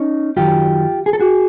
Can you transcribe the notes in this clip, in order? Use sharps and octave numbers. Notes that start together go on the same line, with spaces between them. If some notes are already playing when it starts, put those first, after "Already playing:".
Already playing: C#4 D#4
F#2 D#3 F#3 F4 G4
G#4
A4
F#4 G#4